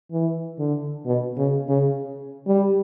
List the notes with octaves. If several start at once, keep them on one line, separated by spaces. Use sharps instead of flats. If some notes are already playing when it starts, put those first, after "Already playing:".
E3
D3
B2
C#3
C#3
G3